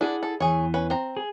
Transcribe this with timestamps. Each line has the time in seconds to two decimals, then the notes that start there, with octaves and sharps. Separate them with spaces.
0.01 D4 E4 G#4 F#5
0.23 A4
0.40 E2 E3 G#4 C#5
0.74 C#4 B4
0.90 C4 A#5
1.17 G#4